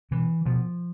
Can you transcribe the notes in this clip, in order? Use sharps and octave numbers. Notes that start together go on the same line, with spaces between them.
B2 E3
B2 F3